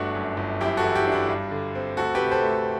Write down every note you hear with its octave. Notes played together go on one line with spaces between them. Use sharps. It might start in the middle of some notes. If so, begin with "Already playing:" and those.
Already playing: G1 A3 D4 F#4
F#2
G1
F#2 E4 G4
F#4 A4
E3
E4 G4
D4
E4
G2
D3
C4
D2 F#4 A4
G4 B4
C3
A4 C5
A3